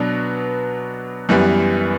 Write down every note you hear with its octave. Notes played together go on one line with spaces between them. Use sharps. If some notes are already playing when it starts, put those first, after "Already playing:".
Already playing: B2 F#3 B3 D4
F#2 E3 G3 B3